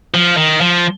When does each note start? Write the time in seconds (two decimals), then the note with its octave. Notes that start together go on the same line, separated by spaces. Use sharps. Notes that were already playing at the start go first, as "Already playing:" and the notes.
0.14 F3
0.37 D#3
0.61 F3